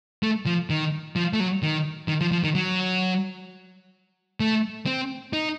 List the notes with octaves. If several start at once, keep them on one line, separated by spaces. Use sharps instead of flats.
A3
F3
D#3
F3
A3
F#3
D#3
D#3
F3
F3
D#3
F#3
A3
C4
D#4